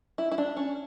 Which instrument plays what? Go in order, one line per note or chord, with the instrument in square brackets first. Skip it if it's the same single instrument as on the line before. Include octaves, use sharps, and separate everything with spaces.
[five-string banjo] E4
E4
D4
C#4